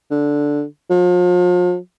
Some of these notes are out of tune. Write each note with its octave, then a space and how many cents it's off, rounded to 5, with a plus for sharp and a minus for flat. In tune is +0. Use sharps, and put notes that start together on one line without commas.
D3 -5
F3 +40